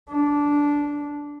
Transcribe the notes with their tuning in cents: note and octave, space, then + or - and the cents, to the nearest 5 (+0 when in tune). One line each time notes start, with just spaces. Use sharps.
D4 -10